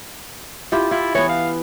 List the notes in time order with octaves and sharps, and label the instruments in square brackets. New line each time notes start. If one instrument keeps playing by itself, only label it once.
[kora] E4 F4 G4
[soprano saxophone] E4 [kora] F4
[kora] E3 B3 [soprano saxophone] C#5
[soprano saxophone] F5